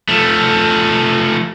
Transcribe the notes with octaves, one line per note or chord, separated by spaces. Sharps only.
F3 A3